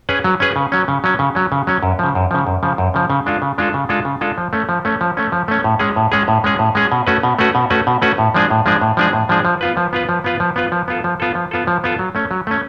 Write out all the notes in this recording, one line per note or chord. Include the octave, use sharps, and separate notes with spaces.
C#4 G#4 B4
F#3
C#4 G#4 B4
C#3
F#3 C#4
C#3
F#3 C#4
C#3
F#3 C#4
C#3
F#3 C#4
F#2
C#3 F3
F#2
C#3 F3
F#2
C#3 F3
F#2
C#3 F3
C#3
G#3 D4 F4 A4
C#3
G#3 D4 F4 A4
C#3
G#3 D4 F4 A4
C#3
G#3 D4 F4 A4
F3
A3 C#4
F3
A3 C#4
F3
A3 C#4
F3
A3 C#4
A2
G#3 C#4 G#4
A2
G#3 C#4 G#4
A2
G#3 C#4 G#4
A2
G#3 C#4 G#4
B2
A3 C#4 F#4 B4
B2
A3 C#4 F#4 B4
B2
A3 C#4 F#4 B4
B2
A3 C#4 F#4 B4
A2
F3 G#3 D4 G#4
A2
F3 G#3 D4 G#4
A2
F3 G#3 D4 G#4
A2
F3 G#3 D4 G#4
F3
B3 F4 B4
F3
B3 F4 B4
F3
B3 F4 B4
F3
B3 F4 B4
F3
B3 F4 A4
F3
B3 F4 A4
F3
B3 F4 A4
F3
B3 F4 A4
F#3
A3 C#4
F#3
A3 C#4